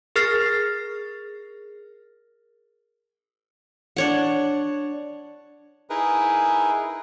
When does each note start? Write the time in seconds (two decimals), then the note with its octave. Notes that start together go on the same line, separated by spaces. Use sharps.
0.16 G#4 A#4 F6 A6 A#6 C7
3.96 D4 C#5 F#5
5.90 D#4 E4 G#4 A#4 B4